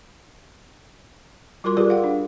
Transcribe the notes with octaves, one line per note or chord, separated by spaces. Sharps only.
G3 F4 F#4 A#4 C6 D6
F4 G4 G#4 A#4 B4 D5
F5 F#5
D4